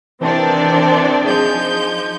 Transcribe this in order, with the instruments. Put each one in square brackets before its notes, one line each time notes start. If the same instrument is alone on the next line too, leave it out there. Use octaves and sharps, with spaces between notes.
[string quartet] C3 D#3 [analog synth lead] E3 [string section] C4 D4 D5
[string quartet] F3 D#4 G6 [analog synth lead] G#4